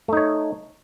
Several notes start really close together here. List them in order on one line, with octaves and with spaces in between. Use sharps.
A3 D#4 C#5